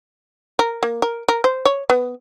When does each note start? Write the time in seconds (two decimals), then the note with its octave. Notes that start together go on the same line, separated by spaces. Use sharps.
0.59 A#4
0.83 A#3
1.02 A#4
1.28 A#4
1.44 C5
1.65 C#5
1.90 B3